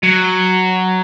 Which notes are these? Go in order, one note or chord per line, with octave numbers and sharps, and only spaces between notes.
F#3